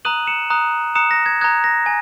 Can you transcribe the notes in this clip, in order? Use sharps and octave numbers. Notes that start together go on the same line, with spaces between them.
A#5 D#6 F#6 D#7 F#7
C#7 E7
A#5 D#6 F#6
A#5 D#6 F#6 C#7 E7
A#6
G#6
A#5 D#6 F#6 G#6
A#6
G#5